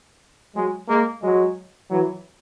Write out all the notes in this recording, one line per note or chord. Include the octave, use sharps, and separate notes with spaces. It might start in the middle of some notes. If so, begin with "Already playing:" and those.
F#3 G#3
G#3 A#3
F#3 G#3
E3 F#3